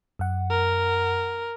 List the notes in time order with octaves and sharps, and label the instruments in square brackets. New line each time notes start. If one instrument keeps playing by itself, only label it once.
[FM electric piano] F#2 F#5
[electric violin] A#4